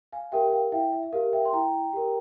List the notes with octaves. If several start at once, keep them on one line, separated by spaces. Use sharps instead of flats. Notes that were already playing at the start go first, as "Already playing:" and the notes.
F5 G#5
G4 A#4 E5 G5
G5
F5
E4 E5 G5
E5
E5
G4 A#4 F5
E5 G5
C6
E4 G5 A#5
G4 A#4